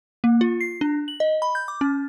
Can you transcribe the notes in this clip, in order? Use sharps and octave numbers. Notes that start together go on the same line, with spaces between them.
A#3
F4
C7
D4
F#7
D#5
B5
G6
D6
C#4